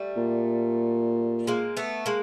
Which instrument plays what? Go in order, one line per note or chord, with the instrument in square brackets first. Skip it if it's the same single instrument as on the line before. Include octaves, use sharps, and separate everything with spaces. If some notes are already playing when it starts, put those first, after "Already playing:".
Already playing: [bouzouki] G3 A3
[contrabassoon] A#2
[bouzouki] G#3 A#3
A3 B3
G#3 A#3